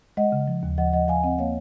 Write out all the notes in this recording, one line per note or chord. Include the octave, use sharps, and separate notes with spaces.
G#3 D#5 F#5
C#3
F3
D#2
F3 D#5 F#5
F3 D#5 F#5
F3 F5 G#5
C4 D#5 F#5
A#3 C#5 F5